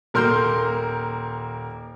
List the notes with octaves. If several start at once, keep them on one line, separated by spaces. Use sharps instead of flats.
D#1 A#3 A#4 C6 F6 G6